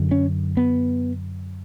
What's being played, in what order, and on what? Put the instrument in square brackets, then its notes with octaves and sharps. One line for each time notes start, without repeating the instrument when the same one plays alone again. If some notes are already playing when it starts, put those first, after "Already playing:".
Already playing: [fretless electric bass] F#2 D3
C#4
B3